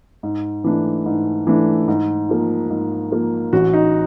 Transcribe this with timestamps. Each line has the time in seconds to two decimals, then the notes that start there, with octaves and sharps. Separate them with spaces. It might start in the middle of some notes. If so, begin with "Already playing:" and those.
0.23 G#2
0.64 E3 A3 D4
1.06 G#2
1.47 E3 A3 D4
1.88 G#2
2.29 F3 A#3
2.70 G#2
3.11 F3 A#3
3.53 A1 F#4
3.73 D#4